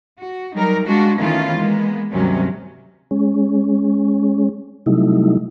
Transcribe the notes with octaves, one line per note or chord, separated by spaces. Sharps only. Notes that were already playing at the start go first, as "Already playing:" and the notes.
F#4
F#3 G3 D#4 A#4
G#3 D4 F4 F#4
D#3 E3 A3 B3 C#4 F4
G#3 A#3 B3
D2 G2 C3 D#3 F#3 C#4
G#3 C#4
C3 F#3 G3 A3 D#4 E4